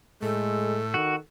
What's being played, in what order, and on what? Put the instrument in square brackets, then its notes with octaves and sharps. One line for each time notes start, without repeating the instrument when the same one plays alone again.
[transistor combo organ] A2 [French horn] G#3 [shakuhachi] A4
[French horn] D#3 [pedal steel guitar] F#4